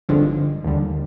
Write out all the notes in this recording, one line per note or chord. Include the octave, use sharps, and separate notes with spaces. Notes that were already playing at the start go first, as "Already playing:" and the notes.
G#1 G2 D3 F3 G#3
D#2 D3 G3